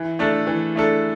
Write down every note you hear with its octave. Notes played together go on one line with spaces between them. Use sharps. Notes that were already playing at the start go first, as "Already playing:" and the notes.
Already playing: E3
A3 D4 A4
E3
A3 D4 A4